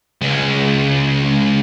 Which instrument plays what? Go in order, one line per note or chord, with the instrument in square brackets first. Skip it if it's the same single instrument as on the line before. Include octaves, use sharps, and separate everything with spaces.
[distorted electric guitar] C#2 G#3